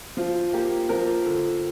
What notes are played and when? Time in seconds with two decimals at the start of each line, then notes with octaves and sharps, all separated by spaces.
0.17 F3 F4
0.53 A#3 G4
0.89 F3 A#4
1.26 D3